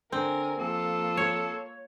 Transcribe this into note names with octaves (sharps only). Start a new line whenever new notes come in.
D3 C4 A#4 G#5
F2 A#3 F4 A4
C#5